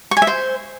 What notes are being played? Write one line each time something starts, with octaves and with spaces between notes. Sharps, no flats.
C#6
G#5
E5
C5